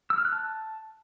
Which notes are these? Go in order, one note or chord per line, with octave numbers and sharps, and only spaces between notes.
E6
F6
F#6
A5